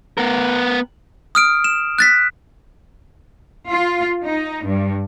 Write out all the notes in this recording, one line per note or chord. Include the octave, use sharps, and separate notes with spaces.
B3 A#4
D#6 F6 D7
E7
F#6 A6 B6
F4
D#4
G2